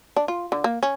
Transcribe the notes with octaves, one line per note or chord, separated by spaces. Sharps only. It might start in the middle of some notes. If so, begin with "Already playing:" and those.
D4
F4
D3
A#3
C#4